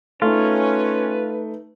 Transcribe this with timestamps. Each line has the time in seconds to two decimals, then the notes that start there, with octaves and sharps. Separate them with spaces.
0.22 A3 C#4 D#4 F4 B4